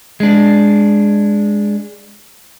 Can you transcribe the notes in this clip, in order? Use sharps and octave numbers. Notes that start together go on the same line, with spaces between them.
G#3 D4